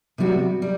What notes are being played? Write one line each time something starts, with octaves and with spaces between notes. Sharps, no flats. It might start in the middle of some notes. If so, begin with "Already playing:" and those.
C3 G3 B3 F#4
G3